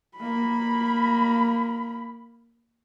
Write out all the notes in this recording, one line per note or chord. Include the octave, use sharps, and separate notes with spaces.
A#3 B5